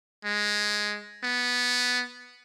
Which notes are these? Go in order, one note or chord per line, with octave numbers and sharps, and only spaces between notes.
G#3
B3